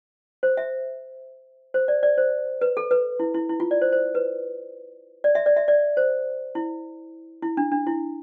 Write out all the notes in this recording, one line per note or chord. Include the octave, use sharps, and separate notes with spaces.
C5
E5
C5
D5
D5
C5
B4
A4
B4
E4
E4
E4
F4
D5
C5
C5
B4
D5
E5
D5
E5
D5
C5
E4
E4
D4
D4
E4